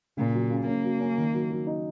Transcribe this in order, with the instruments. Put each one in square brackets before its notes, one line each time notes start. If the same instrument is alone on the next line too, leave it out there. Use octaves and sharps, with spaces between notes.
[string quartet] A#2 [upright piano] C#3
[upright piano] F#3
C#3
[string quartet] A#3 [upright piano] C#4
[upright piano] F#3
C#4
D#3
F#3
F#3
D#4